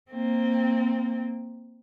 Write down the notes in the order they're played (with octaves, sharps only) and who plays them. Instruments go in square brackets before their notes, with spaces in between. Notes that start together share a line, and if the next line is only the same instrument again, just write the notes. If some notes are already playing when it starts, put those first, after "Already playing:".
[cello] A#3 C4